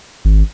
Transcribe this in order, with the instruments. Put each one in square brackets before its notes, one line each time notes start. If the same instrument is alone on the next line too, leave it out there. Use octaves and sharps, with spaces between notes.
[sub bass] G#1